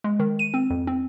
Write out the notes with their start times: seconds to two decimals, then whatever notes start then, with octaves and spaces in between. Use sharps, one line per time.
0.04 G#3
0.20 D#3
0.39 D#7
0.54 C4
0.70 F2
0.87 C4